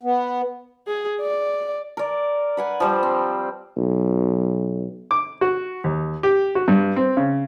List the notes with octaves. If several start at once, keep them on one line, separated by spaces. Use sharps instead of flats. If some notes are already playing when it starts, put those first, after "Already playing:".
B3
G#4
D5
A#4 D5
B4 F#5 G#5
F3 G3 F4
C4
B1
D6
F#4
D#2
G4
F#4
G2
C4
C#3